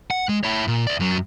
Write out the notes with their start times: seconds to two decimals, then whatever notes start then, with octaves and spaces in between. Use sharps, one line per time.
0.11 F#5
0.29 G#3
0.44 E4 C#5
0.68 A#2
0.87 D5 E5
1.00 F#2 F#3